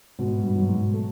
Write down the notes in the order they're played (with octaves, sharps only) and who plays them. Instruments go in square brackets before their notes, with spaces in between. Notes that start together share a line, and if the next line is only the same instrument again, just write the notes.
[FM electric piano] G#2 [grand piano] B2
[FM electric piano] G2
[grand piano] F#3
[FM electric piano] G#2
[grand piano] A3